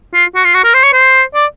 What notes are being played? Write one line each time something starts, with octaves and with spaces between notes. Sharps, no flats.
F4
F#4
F4
F#4
A#4
C5
C#5
C5
D5